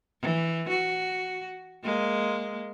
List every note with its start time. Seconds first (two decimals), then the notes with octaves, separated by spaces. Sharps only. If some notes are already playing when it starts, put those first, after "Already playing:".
0.21 E3
0.69 F#4
1.83 G#3 A#3